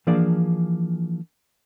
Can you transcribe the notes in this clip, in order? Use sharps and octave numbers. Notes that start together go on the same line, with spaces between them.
E3 F3 A#3 D4 G#4 D5